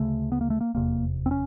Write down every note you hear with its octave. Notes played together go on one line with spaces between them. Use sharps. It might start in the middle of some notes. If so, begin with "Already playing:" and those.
Already playing: D2 C#3 A3
B3
A#3
A3
A#3
F1 E2 C3 A#3
C4
C#4